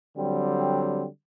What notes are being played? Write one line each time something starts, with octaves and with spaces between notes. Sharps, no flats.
D3 F#3 G3 C4